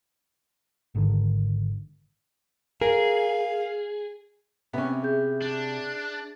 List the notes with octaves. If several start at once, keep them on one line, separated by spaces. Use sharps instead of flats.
G#1 G#2 D3 D#3
G#4 A#4 F5
C3 B3 C#4 E5
G#4 E5 G6
D4